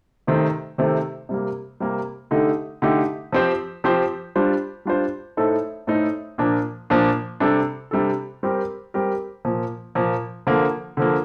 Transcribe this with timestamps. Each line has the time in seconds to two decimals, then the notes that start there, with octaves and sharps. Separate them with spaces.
0.27 C3 D#3 A3 C4
0.78 C3 D#3 A3 C4
1.29 C3 G3 A#3
1.80 C3 G3 A#3
2.31 D3 A3 D#4 G4
2.82 D3 A3 D#4 G4
3.33 F3 C4 G4 C5
3.84 F3 C4 G4 C5
4.35 G3 D4 F4 C5
4.85 G3 D4 F4 C5
5.37 A2 A3 D#4 A4 C5
5.87 A2 A3 D#4 A4 C5
6.38 A#2 F3 A#3 D4
6.90 A#2 F3 A#3 D4
7.40 C3 G3 D4 A4
7.91 C3 G3 D4 A4
8.43 G3 C4 G4 A#4
8.94 G3 C4 G4 A#4
9.45 A#2 F3 A#3
9.95 A#2 F3 A#3
10.47 D3 F3 A#3
10.97 D3 F3 A#3